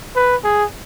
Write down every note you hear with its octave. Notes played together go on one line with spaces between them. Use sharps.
B4
G#4